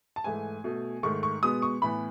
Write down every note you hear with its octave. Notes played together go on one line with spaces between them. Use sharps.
A5
G#2 E3 A3 G#5
B2 A3
G#2 D#3 A3 C#6
C#6
B2 G#3 B3 D#6
C#6
A2 E3 B3 B5